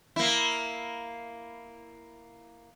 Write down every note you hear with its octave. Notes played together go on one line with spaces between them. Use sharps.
A#3 E4